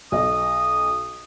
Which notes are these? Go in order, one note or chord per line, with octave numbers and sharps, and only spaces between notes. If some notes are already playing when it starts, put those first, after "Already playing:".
B1 D#5 D#6